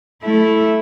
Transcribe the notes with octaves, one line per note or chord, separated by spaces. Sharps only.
A3 E4